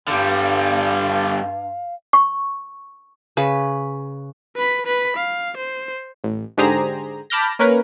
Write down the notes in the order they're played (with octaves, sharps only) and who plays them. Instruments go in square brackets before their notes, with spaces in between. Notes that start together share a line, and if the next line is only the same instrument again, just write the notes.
[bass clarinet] G2 [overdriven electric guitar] D3 G3 [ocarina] F5
[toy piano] C#6
[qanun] C#3 B4
[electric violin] B4 B5
B4 B5
F5
C5
[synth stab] A1
G#2 D3 G4 G#4 C5 A#5
A5 B5 D6 F6 G6 A#6
A#3 C#4 A#4 B4